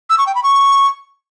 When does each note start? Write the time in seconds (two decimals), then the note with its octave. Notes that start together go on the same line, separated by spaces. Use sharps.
0.10 E6
0.18 C#6
0.27 G5
0.35 B5
0.43 C#6